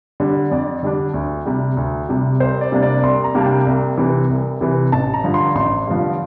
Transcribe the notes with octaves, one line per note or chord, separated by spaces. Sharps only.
D3 G3 D4
F2 D5
D3 G3 D4
D2
C3 G3
D2
C3 G3
C2 C5
D5
C3 G3 A#3 D4
D5
C2 C6
A#5
C3 G3 A#3 D4
A5
G5
C2
C3 E3
C2
C3 E3
A1 A5
A#5
G2 D3 F3
C6
A1 C6
G2 D3 F3